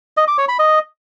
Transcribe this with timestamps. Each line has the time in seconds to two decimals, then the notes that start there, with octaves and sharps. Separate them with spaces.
0.17 D#5
0.28 D6
0.38 C#5
0.49 B5
0.59 D#5